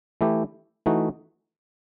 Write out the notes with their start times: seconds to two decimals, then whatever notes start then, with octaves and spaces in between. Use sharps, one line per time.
0.21 E3 A3 E4 G4
0.86 E3 A3 D#4 F#4